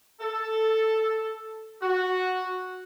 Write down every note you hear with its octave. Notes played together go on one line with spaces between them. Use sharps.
A4
F#4